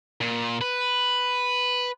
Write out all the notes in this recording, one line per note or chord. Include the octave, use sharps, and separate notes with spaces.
A#2
B4